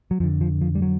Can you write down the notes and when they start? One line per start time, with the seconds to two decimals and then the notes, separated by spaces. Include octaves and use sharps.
0.11 F#3
0.20 F2 F3
0.24 D3
0.41 F3
0.61 F3
0.75 G3
0.82 F#3